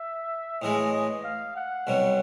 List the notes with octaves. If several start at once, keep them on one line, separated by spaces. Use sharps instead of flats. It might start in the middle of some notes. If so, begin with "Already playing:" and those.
Already playing: E5
A2 E3 G#3 D#5
D#5
F5
F#5
C2 B2 F#3